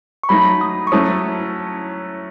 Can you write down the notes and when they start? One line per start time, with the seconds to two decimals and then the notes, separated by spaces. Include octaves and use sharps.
0.23 C#6
0.29 F#3 A3 D#4 B5
0.61 D#6
0.87 C#6
0.92 F#3 A3 C#4 E4 A4 D#6